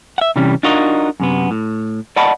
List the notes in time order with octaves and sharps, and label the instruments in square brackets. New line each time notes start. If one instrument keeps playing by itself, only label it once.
[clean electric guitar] E5 F#5
C3 E3 G3 C#4
D4 D#4 F4 F#4 A#4 D#5
F#2 C3 B3
A2
D5 D#5 F#5 A5 B5